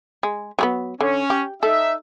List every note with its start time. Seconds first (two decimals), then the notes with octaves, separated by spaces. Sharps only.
0.23 G#3
0.59 F#3 G#3 B3
1.01 D3 C#4
1.30 G4
1.63 D#4 A4 E5